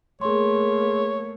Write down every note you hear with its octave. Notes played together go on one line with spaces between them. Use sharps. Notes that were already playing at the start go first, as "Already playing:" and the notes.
A3 A#3 G#4 C#5 C6